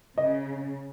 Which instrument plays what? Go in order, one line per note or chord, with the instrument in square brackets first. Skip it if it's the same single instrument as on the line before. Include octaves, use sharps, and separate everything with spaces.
[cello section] C#3 [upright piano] D#5